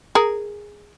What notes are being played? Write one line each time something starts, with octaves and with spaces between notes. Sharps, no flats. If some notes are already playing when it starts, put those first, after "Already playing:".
G#4 A#4